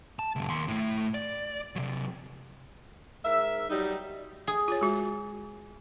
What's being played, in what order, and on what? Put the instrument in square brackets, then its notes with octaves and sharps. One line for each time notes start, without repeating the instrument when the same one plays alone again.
[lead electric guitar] A5
C#2 F#2
D#2 C6
A2 A3
D5
C3 F#3
[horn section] G#2 A#4 E5
F#3 G3 D#4
[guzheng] G#4
[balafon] F4 C#5
G#3 F#4